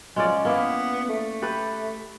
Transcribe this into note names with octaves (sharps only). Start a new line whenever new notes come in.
F3 G#3 C#4 D5
A#3 B3 E4
A3
G4 A4 B4